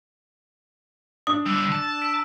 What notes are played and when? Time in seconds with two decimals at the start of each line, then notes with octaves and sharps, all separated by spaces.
1.27 D4 D#6
1.46 D3 G3 E6
1.72 A5
2.02 E6 B6 D7